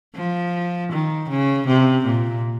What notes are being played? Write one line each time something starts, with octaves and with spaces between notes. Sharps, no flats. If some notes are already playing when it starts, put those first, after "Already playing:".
F3
D#3
C#3
C3
A#2